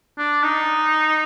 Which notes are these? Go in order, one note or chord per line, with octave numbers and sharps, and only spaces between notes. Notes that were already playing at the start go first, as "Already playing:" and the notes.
D4
D#4